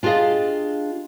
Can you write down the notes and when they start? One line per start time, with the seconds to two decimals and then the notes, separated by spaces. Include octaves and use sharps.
0.03 D4 F4 G4 G#4 D#5 F5